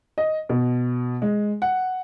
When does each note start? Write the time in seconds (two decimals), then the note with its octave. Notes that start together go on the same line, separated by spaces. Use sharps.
0.18 D#5
0.49 B2
1.22 G#3
1.62 F#5